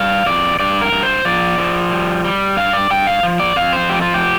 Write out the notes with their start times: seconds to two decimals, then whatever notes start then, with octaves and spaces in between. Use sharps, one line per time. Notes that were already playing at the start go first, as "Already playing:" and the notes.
Already playing: G3 F5
0.26 F2 D5
0.60 G2 D5
0.81 A#4
0.92 G2
1.03 C5
1.25 F3 D5
1.58 F3
1.91 G3
2.25 G3
2.57 G2 F5
2.73 D5
2.90 G2 G5
3.07 F5
3.23 F3
3.40 D5
3.56 F2 F5
3.73 C5
3.89 F3 G4
4.02 F4
4.14 G4